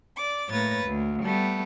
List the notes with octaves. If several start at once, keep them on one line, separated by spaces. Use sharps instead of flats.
D5 D6
A2 A#3 B4 C#5 A6 A#6
D2
G3 A3 B3